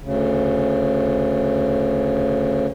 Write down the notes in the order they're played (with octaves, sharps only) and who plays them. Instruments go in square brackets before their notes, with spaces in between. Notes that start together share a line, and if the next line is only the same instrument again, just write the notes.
[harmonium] D2 C#3